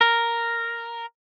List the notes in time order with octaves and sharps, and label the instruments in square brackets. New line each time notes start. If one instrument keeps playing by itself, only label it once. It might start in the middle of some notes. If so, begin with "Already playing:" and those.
[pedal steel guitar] A#4